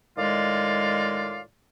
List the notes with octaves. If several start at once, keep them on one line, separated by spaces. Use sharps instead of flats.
A2 D#3 G#3 F4 D5 F5